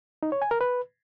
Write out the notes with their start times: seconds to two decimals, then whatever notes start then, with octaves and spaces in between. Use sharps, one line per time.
0.23 D#4
0.32 C#5
0.42 G#5
0.51 A#4
0.61 B4